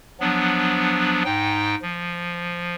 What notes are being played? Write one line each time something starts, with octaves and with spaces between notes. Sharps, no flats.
F3 F#3 B3 D4
G#2 D#4 G5
F3